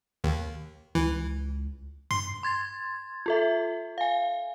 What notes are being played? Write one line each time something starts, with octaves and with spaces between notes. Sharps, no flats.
D#2
C#2 E3
G2 C6
C6 G#6 A6
F4 A4 E5
F5 G#5